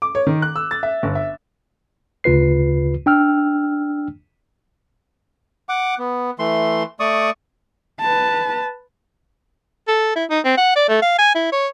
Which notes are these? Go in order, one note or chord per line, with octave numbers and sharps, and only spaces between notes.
D6
C#5
D#3
F#6
E6
A6
E5
G1
E5
D2 C#3 F4 B4 C7
D4 G5 E6 F6
F#5 D6
B3
E3 A3 C6
A3 D5 C#6 D#6
B4 A5
A4
E4
D#4
C4
F#5
D5
A3
F5
G#5
E4
C#5